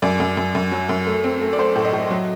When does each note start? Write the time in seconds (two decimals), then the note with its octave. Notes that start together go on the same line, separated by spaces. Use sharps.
0.02 F#2 D5
0.20 F#2
0.37 F#2
0.55 F#2
0.72 F#3
0.89 F#2
1.07 A3
1.24 C4
1.41 A3
1.53 D5
1.59 A3 C5
1.75 A2
1.85 D#5
1.93 A2
2.10 F#3